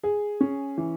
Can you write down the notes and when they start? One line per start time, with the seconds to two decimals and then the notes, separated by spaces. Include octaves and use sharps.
0.03 G#4
0.41 C#4
0.78 E3